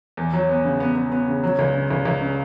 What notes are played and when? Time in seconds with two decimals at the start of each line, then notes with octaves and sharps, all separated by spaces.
0.17 E2
0.33 F#3
0.49 B3
0.64 C#3
0.80 B3
0.96 B3
1.12 B3
1.27 C#3
1.44 F#3
1.59 C#2
1.74 C#3
1.91 C#2
2.05 C#2
2.21 C#3